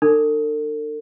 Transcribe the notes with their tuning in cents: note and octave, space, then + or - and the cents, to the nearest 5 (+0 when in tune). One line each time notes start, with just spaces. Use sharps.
D4 +40 A4 +45